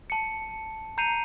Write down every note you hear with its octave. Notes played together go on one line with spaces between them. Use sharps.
A5 C#7
A#5 G6 C7 C#7 D#7 F7